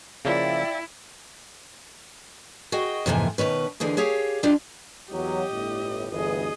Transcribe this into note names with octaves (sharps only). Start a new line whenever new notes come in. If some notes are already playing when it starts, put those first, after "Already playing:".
C#3 F3 A#3 E4 D5 E5 F5 G5
F#4 G#4 D#5 G5
F2 G#2 C3 E3 A#3 G#5
B2 D#3 C#4 B4
D#2 D3 E3 F3 G#4
G4 G#4 C#5 F5
G3 D4 D#4 F4 G4
E2 F#3 G4 D#5
G1 A2
G1 D2 E3 G#4 D#5